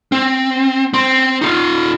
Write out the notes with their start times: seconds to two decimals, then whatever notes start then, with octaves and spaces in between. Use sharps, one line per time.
0.12 C4
0.94 C4 C6
1.41 D#4 F4